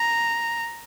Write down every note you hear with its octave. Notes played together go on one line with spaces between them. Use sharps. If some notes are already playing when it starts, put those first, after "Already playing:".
Already playing: A#5